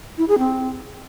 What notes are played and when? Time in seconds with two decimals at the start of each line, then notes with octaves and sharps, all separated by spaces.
0.18 E4
0.28 G#4
0.39 C4